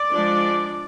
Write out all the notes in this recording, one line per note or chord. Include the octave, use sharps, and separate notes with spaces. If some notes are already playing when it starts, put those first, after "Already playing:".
Already playing: D5
F3 G#3 D4